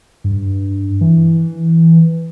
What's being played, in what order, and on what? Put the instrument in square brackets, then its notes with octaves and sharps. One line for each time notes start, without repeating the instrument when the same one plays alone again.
[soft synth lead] G2
E3